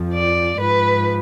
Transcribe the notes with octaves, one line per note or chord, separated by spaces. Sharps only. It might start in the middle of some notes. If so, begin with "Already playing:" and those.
Already playing: F2 F3
D5
G#2 F3 B4